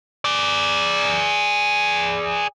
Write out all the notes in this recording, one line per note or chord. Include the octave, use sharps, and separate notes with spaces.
G#4 D5